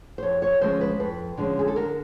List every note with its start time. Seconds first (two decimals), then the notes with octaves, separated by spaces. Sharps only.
0.18 C5
0.23 F2 C#5
0.42 C#5
0.61 D3 F3 G#3 C#4 C5
0.81 B4
1.00 F2 B4
1.37 D3 F3 G#3 C#4
1.59 G#4
1.68 A4
1.76 D3 A#4